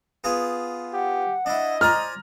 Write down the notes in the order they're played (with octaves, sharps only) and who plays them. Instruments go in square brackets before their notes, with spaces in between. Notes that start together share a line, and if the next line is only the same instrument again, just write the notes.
[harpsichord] B3 F4 G#4
[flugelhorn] G4 [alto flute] F#5
[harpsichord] D4 E4 [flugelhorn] D#5
[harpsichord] C5 D5 G#5 [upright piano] A#5 F6